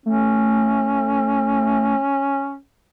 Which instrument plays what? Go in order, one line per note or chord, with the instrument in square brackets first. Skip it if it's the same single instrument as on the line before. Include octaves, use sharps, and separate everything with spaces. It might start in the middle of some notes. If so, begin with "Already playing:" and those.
[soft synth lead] A3 [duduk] C#4